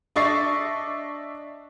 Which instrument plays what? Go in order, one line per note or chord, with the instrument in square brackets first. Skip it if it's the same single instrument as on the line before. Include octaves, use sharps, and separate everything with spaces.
[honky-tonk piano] D4 D#5 E5 C#6 A6 C7